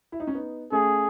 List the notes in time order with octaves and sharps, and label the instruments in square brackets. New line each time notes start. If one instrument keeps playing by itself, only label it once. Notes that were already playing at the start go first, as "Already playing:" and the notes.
[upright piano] E4
D#4
C#4
B3 D#4
[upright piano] A3 C#4 [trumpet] G#4